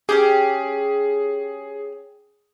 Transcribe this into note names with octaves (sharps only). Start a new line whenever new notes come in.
C#4 E4 G4 G#4